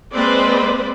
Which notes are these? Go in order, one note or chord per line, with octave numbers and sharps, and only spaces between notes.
G#3 A#3 C4 B4 C5 D5